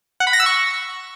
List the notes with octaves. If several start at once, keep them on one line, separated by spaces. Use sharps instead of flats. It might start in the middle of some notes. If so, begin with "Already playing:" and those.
F#5
B5
A#6
E6
C#6